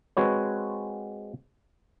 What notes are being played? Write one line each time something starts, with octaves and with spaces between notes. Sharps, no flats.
G#3 C4 F#4 B4 C#5